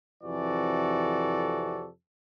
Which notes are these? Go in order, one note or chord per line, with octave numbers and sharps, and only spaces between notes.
F2 C3 E3 F#4 A4 D5